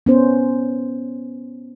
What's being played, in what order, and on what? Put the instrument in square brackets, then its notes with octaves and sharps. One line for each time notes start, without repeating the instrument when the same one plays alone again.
[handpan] B3 C#4 C5